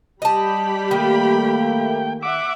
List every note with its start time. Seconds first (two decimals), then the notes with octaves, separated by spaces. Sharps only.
0.22 G3 G4 D#5 A5 B5
0.91 D#3 A3 A#3 G5
2.23 E5 F#5 D6